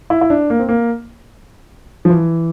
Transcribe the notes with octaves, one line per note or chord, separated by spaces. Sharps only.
E4
E4
D4
A#3
C4
A#3
F3
E3